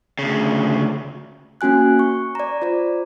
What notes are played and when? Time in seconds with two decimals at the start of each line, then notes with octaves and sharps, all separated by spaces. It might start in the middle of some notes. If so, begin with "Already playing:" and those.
0.19 D2 C#3
1.61 A#3 C#4 F#4 G#5 F#6
1.99 C#6
2.35 D5 A#5
2.62 F4 C5 D5